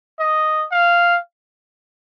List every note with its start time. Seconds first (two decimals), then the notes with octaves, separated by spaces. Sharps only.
0.19 D#5
0.71 F5